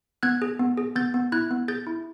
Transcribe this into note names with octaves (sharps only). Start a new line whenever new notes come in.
B3 F#6 G#6
G#4
B3
G#4
B3 G6 A6
B3
E4 F#6 G#6
B3
G#4 G6 A6
E4